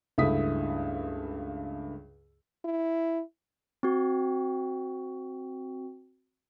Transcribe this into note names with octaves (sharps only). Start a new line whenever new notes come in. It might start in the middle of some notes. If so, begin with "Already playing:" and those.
C#2 G2 A3 E4 D#6 B6
E4
C4 F#4